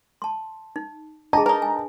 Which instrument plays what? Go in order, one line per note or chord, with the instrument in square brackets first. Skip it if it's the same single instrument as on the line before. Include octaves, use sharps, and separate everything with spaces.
[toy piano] A5 C6
D#4
[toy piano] D4 G#4 [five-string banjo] D#5 [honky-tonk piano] A5 A#5
[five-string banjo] D#4 A#4 [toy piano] B4
[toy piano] G#5